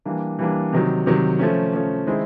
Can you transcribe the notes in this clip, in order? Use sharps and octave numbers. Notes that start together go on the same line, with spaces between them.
E3 G3 A#3 D4
E3 G3 A#3 D4
C3 D#3 F#3
C3 D#3 F#3
F3 A3 C#4
F3 A3 C#4
D#3 G#3 C4 E4